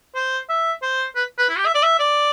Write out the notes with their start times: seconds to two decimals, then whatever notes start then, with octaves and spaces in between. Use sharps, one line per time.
0.15 C5
0.49 E5
0.82 C5
1.15 B4
1.38 B4
1.49 E4
1.57 G4
1.66 E5
1.74 D5
1.83 E5
1.99 D5